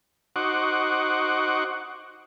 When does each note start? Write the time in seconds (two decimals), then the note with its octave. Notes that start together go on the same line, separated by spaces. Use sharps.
0.36 D#4 F#4 C5 F#5 C#6 D6